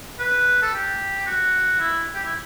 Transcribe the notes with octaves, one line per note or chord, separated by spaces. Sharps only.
B4
A4
G4
F#4
E4
G4
E4